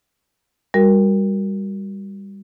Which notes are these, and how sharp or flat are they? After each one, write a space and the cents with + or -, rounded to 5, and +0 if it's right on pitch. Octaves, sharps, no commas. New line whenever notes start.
G3 +20 F#4 +0 A#4 +5